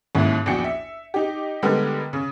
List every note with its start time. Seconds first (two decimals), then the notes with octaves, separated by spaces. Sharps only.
0.15 A1 D#2 G#2 E4
0.46 A#1 E2 F#4 G5 C#7
0.64 E5
1.14 D#4 G4
1.63 D3 G3 G#3 B3 G4 A#4
2.13 C#3